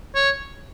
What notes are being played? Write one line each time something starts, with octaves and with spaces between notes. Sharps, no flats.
C#5